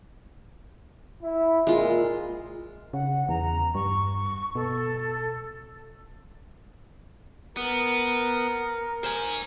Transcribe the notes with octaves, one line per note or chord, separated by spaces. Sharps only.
E4
A#2 G#3 F4
C#3 F#5
E2 A#5
G2 C#6
B2 A4
B3 A#4
C5 G#5